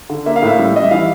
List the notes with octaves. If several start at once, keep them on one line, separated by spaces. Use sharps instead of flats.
D3
A#3 E5
F5
A2 E5
G3
G3 D#5
E5
E3 F5